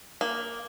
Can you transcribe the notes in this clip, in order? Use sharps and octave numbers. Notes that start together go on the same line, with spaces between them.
A#3